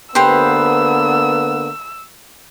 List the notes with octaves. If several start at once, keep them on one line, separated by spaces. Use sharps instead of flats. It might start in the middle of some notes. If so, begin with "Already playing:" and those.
D3 A#3 B3 G4 B4 C5 E6